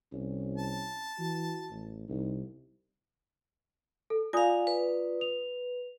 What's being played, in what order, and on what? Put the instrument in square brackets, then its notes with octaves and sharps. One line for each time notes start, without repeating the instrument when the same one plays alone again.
[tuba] C2 [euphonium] C#4
[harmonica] A5
[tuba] E3 [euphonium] F#4
[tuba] A1
[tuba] C2 [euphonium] D#4
[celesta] A4
[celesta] F4 D5 D#6 [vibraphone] F5 G#5
[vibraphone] B4
[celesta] F7